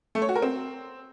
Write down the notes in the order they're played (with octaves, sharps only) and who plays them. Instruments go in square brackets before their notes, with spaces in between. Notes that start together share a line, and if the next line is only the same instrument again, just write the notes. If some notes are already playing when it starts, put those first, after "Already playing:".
[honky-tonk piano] A3
C#5
F#4
A#4
C4